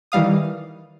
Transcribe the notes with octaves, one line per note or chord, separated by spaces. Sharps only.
D#3 E3 G3 F5 D#6